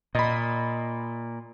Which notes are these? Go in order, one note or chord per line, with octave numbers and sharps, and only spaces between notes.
A#2 D#5 B5